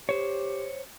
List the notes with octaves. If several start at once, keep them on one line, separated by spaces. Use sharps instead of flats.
G4 C5 C#5